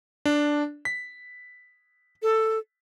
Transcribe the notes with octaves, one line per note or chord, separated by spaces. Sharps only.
D4
B6
A4